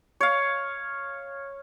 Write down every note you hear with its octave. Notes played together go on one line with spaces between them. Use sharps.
C#5 F5